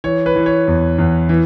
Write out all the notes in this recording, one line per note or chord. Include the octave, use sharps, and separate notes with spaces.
E3 C#5
B4
E3
C#5
E2
E2
E3